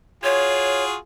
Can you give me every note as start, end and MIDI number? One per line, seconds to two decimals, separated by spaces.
0.24 0.95 65
0.24 0.95 66
0.24 0.95 68
0.24 0.84 73